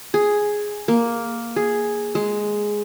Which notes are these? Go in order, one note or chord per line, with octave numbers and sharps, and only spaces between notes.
G#4
A#3
G#4
G#3